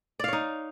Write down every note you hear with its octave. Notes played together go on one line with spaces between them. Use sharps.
D#4 C#5 D5 F5